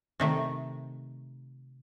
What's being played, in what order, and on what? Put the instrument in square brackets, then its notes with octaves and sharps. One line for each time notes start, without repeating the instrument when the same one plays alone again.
[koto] C3 D#3 A3